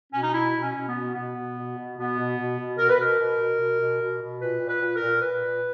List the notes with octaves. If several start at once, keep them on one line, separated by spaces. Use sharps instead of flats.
B2 C#4
D#4
B2 E4
B2
C#4
B2
B3
B2
B2 B3
B2
B2
B2
B2 B3
B2
B2
B2
B2 A#4
B4
B2 A#4
B2
B2
B2
B2
B2
B2
A#2 B4
A#2
B4
A#2
A#4
A#2
A#2 B4
A#2